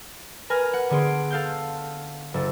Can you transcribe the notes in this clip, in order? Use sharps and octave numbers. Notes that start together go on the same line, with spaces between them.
A#4 B4 G#5 F6 A#6
F#5
D3 B3 G#4 C6 D7
A4 F5 G6
F#1 A4